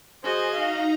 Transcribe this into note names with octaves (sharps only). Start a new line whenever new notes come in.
F#4 G#4 C5 D#5
D#4 F5 A#5